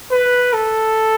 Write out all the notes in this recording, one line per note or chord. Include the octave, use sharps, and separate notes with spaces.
B4
A4